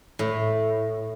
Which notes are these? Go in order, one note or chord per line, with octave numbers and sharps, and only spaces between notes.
A2